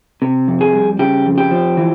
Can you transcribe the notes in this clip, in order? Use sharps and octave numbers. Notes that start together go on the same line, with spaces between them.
C3
F2
G#4
G3
C#3 G4
F2
G4
F3
E3